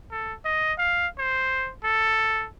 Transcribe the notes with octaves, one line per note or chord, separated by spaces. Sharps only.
A4
D#5
F5
C5
A4